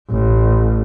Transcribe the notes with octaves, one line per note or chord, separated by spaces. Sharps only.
A1